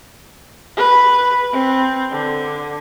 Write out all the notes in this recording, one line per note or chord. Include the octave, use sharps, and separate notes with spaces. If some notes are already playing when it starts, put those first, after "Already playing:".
B4
C4
D3